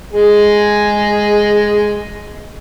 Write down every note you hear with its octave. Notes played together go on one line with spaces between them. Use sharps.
G#3 G#4